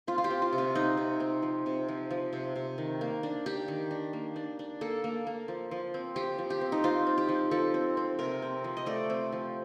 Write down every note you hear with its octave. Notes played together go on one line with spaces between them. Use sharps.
C4 F4
F4
G4
C4
F4
C3
F4
C4 D#4
C3
C4
F3
C3
F3
F3
C3
C3
D#3
A#3
D4
D4 G4
D#3
D4
A#3
D4
D4
A#3 A4
A#3
A#3
F3
F3
C4
F3 G4
F3
G4
C4
D#4
C4 F4
C4
G4
F3
F3 A4
C4
C4
C3 A#4
C4
F3
D#5
A3 D5
C4
F3